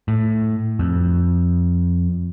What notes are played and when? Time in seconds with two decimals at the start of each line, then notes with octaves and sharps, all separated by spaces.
0.08 A2
0.79 F2